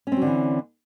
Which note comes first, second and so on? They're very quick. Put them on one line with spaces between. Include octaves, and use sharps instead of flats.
C#4 C4 F#3 D3 E3